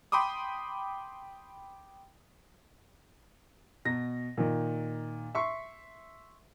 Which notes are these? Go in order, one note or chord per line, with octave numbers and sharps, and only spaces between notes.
G5 B5 C6 D6 D#6
B2 A#6
A#2 D#3
E5 C6 C#6